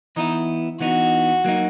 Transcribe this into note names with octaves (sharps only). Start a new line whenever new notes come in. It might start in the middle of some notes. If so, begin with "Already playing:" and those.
E3 B3 D#4 E4
E3 B3 D#4 F#4
F#3 A#3 D#4